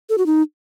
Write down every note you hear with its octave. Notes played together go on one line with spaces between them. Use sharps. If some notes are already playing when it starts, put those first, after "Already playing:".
A4
F#4
D#4